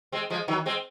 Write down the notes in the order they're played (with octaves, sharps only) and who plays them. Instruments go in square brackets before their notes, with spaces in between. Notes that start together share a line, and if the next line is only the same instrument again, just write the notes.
[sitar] G#3 C4
F3 G#3
D#3 F#3
G#3 C4